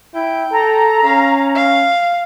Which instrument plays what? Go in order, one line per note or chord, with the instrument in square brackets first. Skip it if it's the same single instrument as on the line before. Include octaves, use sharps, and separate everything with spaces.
[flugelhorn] E4 [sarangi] G5
[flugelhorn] A4 [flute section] A#5
[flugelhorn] C#4 [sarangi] F5
[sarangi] F5